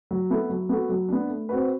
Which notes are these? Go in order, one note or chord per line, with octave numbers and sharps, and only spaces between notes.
F#3
B3 E4 A4
F#3
B3 F#4 A4
F#3
B3 D4
A3
C4 F#4 B4